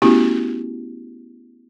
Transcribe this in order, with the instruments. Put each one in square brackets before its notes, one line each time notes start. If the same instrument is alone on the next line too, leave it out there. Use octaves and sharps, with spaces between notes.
[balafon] A3 B3 C#4 E4 F#4 G4